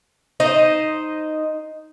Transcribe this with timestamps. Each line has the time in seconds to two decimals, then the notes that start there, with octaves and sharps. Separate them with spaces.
0.40 D#4 C5 D#5